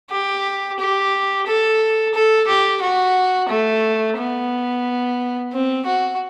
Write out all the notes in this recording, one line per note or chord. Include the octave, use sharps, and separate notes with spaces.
G4
G4
A4
A4
G4
F#4
A3
B3
C4
F#4